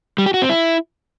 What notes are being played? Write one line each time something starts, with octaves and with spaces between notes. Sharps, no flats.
G3
G4
F#4
C4
E4